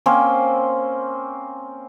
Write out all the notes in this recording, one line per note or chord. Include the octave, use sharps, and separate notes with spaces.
A#3 C4 C#4 C5